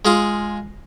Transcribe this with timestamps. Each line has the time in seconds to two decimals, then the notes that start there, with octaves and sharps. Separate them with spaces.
0.05 G#3 F4 G#4